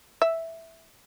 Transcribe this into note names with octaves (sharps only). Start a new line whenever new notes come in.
E5